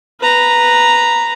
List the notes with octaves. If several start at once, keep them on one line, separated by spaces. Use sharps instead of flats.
B4 A#5